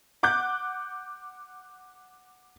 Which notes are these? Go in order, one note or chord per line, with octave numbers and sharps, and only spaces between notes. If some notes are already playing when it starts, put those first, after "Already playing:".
F#5 D6 F#6 G6